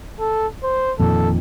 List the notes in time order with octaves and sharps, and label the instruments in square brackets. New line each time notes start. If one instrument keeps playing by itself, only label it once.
[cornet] A4
C5
[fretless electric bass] F2 A#2 D#3 [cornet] A4